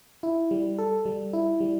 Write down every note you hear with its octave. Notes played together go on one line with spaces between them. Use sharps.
E4
G3
A4
G3
E4
G3